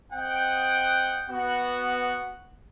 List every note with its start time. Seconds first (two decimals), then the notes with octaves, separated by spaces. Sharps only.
0.13 C4 D#5 F#5 G5
1.30 B3 F#4 F#5